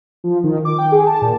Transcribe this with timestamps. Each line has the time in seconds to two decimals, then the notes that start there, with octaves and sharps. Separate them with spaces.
0.24 F3
0.44 D#3
0.65 D6
0.78 G5
0.92 G#4
1.07 A5
1.22 A#2